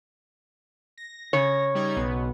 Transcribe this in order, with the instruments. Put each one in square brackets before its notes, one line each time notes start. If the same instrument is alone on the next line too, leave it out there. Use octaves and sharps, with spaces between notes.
[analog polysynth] A#6
[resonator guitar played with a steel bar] C#3 C#5
[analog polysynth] G3 D#4 G#6
B1 B2 B3